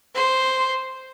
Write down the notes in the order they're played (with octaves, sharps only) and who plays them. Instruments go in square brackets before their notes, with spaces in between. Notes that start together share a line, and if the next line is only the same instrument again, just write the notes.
[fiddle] C5